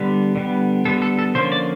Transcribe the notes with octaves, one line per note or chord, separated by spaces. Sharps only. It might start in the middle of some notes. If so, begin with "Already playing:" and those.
Already playing: D3 G3 B3
D3 G3 B3
D3 G3 B3 A4
A4
A4
D3 F3 A#3 C#4 C5
D5